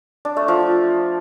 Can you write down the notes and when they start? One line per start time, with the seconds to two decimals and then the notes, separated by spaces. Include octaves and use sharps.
0.25 D4
0.37 A3
0.48 F3